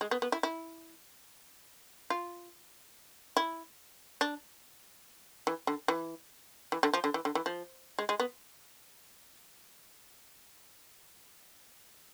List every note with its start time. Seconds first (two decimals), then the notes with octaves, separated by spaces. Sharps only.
0.01 G#3
0.11 B3
0.22 B3
0.32 E4
0.43 E4
2.10 F4
3.37 E4
4.21 D4
5.47 E3
5.67 D3
5.88 E3
6.72 E3
6.83 D3
6.94 F3
7.04 D3
7.14 E3
7.25 D3
7.35 E3
7.46 F3
7.99 G#3
8.09 G#3
8.20 B3